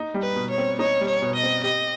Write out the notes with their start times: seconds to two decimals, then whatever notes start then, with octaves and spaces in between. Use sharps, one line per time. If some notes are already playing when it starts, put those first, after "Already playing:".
Already playing: D#4
0.14 G3
0.22 B4
0.36 B2
0.50 C#5
0.58 C4
0.79 D#4 C#5
1.01 G3
1.07 C#5
1.22 B2
1.36 D#5
1.43 C4
1.64 G4 D#5